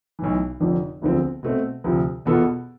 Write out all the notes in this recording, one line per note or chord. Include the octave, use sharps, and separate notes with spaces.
B1 A2 E3
F1 F2 D3 F3
E1 D2 D3 F3 C4
B2 A3 C4
D2 C3 F3
E2 B2 B3 F4 A4